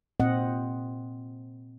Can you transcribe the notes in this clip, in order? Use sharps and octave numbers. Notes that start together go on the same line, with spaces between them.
A#2 C4 D#5 F#5